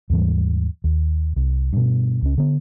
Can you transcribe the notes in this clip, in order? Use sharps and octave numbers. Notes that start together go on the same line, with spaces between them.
D#2 G#2 E3 G3
D#2
C2
G2 B2
C#2 C#4
D3 B3